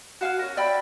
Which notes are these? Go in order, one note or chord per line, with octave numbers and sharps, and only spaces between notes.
F#4 F5 G#5 F6
C#4 A#4
D5 E5 G5 B5